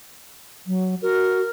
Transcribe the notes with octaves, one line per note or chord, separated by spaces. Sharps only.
F#3
F#4 A#4